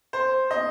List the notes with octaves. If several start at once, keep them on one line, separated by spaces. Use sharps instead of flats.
C5
D#5